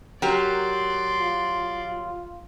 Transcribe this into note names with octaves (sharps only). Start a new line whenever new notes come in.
F#3 G4 A#4 D5 C6
F4